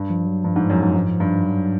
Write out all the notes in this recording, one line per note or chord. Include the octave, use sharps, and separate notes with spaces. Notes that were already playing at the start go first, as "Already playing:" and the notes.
Already playing: G2
F3
F#3
G2 F3
G#2
F#2
G#2
G#2
G2
F#3